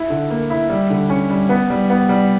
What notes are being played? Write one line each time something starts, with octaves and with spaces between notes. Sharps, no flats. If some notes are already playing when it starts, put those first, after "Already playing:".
Already playing: E4
D3
A#3
E4
G3
D3
C#4
G3
B3
G3
B3
G3